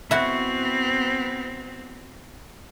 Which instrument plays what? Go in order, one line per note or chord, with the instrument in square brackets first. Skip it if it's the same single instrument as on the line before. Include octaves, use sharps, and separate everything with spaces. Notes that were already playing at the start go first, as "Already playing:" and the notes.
[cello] B3 C4 [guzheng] E4 F#4